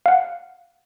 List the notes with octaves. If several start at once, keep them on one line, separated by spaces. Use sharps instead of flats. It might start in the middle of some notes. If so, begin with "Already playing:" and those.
F5 F#5